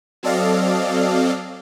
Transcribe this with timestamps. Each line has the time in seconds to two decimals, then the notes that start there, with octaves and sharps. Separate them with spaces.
0.23 F#3 C4 A4 D5 D#5 F5